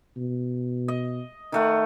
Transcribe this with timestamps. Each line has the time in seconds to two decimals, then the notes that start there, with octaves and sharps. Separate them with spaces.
0.16 B2
0.88 D#5
1.52 D#3 A3 F#5